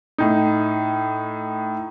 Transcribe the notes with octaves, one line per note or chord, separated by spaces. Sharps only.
A2 D#4